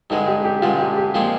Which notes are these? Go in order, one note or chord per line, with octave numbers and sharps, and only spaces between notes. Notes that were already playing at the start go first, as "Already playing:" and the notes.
G2 D3 G#3 D#4
G4
G4
G2 D3 G#3 F4
G4
G4
A#2 F3 G#3 C4 F4